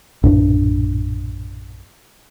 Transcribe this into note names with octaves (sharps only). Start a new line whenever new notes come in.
A#1 F#2 A2 D4